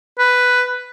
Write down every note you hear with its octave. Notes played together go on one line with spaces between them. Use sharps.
B4